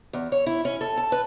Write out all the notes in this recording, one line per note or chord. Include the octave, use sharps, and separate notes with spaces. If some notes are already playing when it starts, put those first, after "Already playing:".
E2
C#5
E4
C#4
A4
A5
B4